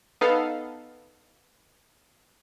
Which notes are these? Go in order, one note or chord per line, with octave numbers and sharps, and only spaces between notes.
B3 D#4 A4 F5